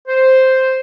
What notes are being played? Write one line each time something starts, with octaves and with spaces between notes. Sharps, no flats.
C5